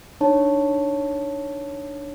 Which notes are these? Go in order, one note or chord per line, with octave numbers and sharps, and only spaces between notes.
D4 D#4 C#5 A5